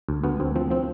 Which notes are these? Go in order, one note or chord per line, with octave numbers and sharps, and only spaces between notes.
D2
D2 B3
D2 C4
F3 C4
F3 C4